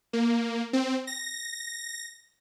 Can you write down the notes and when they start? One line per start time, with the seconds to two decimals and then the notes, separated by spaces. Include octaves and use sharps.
0.13 A#3
0.73 C4
1.07 A#6